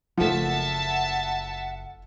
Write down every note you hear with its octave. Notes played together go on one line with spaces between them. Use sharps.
F#1 F3 A3 A#3 E5 F#5 A5